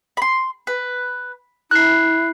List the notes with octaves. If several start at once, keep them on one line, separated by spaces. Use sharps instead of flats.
B5 C6
B4
E4 A#4 F#6 C7